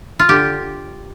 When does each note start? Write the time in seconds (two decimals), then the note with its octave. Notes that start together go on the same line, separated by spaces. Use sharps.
0.19 F4
0.29 D3 G4